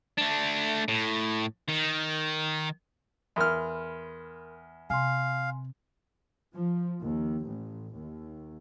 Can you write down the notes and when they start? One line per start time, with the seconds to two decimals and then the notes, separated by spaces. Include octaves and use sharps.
0.18 A3 D4
0.88 A2
1.68 D#3
3.36 E2 A#4 B5 C6 F6
4.90 C3 F5 G#5 C6
6.55 F3
7.01 D#2
7.45 A1
7.96 D#2